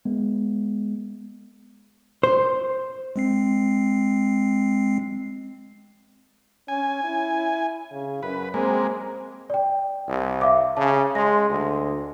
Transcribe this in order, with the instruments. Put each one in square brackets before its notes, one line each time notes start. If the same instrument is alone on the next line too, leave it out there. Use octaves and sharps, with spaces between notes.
[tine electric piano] G#3 B3
[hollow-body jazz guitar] C5
[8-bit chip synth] G#3 C4 C7
[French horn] C#4 [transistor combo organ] G#5
[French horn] E4
C#3
[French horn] F#2 [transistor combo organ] B4
[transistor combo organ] G#3 A#3 [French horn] C4
[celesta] D5 G5
[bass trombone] C2
[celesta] E5 F5 D6
[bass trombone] C#3 [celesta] A5
[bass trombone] G#3 [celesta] C6 A#6
[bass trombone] D2